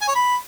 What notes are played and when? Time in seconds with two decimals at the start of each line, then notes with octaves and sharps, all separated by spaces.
0.01 G#5
0.08 C#5
0.15 B5